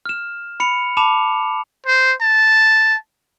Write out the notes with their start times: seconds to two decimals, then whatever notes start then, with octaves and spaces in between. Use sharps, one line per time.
0.05 F6 E7
0.60 B5 C#7 F7
0.97 A5 B5 D6 E7 F7
1.86 C5
2.21 A5